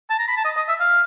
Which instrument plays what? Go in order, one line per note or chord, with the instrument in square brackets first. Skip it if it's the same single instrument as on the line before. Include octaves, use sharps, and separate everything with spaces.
[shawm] A5
A#5
B5
A5
D#5
D#5
E5
F5